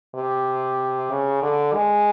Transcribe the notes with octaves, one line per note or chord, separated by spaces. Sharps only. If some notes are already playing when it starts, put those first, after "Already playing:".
C3
C#3
D3
G#3